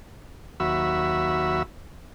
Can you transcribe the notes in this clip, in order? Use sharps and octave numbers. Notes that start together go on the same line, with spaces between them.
D#2 F#3 F#4 E5 B5 E6